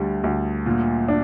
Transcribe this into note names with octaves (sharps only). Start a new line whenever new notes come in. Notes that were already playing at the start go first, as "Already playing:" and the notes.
Already playing: D2 D3 G3
D2
A#2
D4